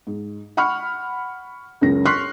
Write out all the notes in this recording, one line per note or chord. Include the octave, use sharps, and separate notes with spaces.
G#2
F#5 B5 C#6 F6
C#2 F#2 C#3 A#6
C6 C#6 F6 F#6 B6 C7